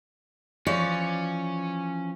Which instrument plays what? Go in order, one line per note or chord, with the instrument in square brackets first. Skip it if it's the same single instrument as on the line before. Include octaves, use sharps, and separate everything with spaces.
[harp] E3 F3 [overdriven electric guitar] C#4 [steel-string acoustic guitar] C#5 D5